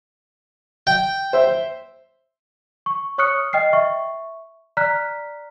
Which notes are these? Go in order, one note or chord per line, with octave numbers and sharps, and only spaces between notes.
G5
C5 E5
C#6
C#5 C#6 D#6 F6 F#6 C#7
D#5 G5 F6 C7
E5 C#6
D5 A#5 F6 F#6 B6